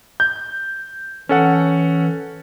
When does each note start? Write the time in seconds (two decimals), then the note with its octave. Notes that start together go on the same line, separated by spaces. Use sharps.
0.20 G6
1.29 E3 C#4 A4 F#5